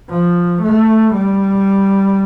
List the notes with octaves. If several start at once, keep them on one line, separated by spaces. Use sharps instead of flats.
F3
A3
G3